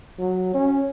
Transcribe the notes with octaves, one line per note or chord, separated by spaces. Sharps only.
F#3
C#4